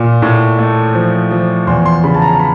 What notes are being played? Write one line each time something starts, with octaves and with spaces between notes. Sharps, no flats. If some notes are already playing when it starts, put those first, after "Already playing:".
Already playing: A#2
A2
A3
F3
F3
E2 C6
C6
C#3 B5
A5
A#5
B5